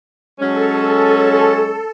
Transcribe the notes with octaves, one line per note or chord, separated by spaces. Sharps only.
F#3 G#3 C#4 A4